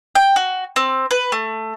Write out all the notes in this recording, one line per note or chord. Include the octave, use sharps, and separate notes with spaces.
G5
F#4
C4
B4
A3